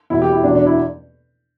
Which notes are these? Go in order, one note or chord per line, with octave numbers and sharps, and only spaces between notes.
E2 B2 E4
G4
E4
E2 B2 D4
D4
E4